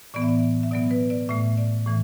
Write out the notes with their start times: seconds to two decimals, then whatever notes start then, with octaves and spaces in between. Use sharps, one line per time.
0.14 A2 E3 B3 D5
0.22 E5
0.28 D5
0.63 E5
0.71 B2 F#3 B3 D5
0.91 B4
1.10 D5
1.29 A2 A3 E5
1.58 D5
1.86 A2 E3 A3